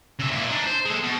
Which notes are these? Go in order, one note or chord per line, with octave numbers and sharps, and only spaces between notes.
C#3 E5
A#2 E4
D4 D#4
C5
G#3 A4
B2